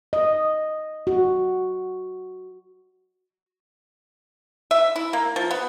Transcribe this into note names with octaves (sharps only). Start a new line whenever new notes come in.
D#5
F#4
E5
E4
A#3
F3
B3